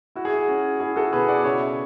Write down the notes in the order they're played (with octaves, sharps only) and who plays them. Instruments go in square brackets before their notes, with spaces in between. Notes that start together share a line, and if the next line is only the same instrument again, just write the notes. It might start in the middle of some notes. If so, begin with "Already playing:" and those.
[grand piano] E4 F#4
G#4
F#4
C#4
E4 G#4
F#4 A4
B2 G#4 B4
D5 F#5
C#3 C#5 E5